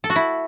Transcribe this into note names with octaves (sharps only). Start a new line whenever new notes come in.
A4
F#4
E4